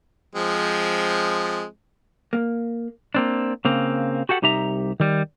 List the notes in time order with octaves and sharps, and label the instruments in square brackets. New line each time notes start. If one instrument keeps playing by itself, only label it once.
[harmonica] F3 G#3 C4
[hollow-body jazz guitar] A#3
[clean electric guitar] A#3 C4 D4
C#3 A#3 C4
F#4 G4 A4 F#5
C2 D#4 G4 E5 A#5
D#3 G3